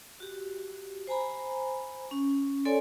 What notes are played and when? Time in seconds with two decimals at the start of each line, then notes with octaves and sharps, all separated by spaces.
0.20 F#4 G4
1.07 C5 G#5 A#5 B5
2.11 C#4
2.65 A4 C#5 D5 G#5 C6